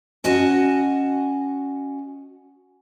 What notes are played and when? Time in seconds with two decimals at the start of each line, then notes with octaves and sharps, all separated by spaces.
0.24 C#4 F#4 D#5 F#5 G#5 A5